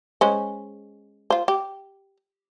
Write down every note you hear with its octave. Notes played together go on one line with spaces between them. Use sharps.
G#3 C#4 C5
F4 C5
G4